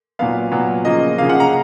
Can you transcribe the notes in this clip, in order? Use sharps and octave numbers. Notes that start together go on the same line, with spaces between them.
A#2 F#3 B3 F5
A#2 F#3 B3
C#3 F3 A#3 D#5
C#3 F3 A#3 F5
F#5
A#5